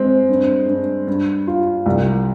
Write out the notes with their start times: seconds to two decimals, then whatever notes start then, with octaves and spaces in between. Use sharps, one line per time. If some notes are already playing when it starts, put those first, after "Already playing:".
Already playing: G#3 C4
0.29 G2
0.68 G2
1.07 G2
1.48 F4
1.86 C2